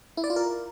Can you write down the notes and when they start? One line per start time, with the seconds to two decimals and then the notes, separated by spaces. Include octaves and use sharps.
0.17 E4
0.24 D5
0.30 F4
0.36 A#4